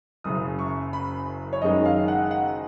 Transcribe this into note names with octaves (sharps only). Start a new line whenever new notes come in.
F#1 F#2 C#3 D#6
C#6
B5
C#5
F#1 F#2 D#3 G#3 D#4 D#5
F5
F#5
F#5